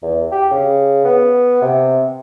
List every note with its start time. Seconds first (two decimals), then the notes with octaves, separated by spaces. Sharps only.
0.03 E2
0.32 G4
0.51 C#3
1.05 B3
1.62 C3